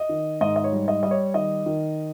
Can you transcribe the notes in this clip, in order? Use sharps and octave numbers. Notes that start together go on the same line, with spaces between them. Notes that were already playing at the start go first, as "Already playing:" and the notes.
Already playing: D#5
D#3
G#2 D#5
D#5
C#5
G3
D#5
G3 D#5
C#5
D#3 D#5
D#3